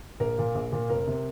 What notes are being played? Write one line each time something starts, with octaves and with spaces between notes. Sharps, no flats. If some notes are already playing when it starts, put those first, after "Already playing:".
A#1 A#4
A#2 A#3
A#1
A#2 A#3
F1 A#4
C3